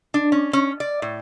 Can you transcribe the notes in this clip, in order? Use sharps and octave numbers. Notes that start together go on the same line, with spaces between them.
D4
C#4
C#4
D5
A2